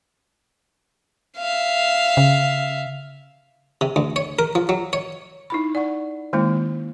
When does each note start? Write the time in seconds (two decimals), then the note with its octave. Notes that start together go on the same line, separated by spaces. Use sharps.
1.38 E5 F5
2.17 C#3
3.81 C3
3.96 D2
4.16 C#5
4.39 A#4
4.55 F3
4.69 F#3
4.93 C#5
5.50 D#4 E4 B5
5.75 D5 F#5 C#6
6.33 D#3 G#3 A#3 C#4 E4